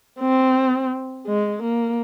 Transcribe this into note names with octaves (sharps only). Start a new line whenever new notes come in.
C4
G#3
A#3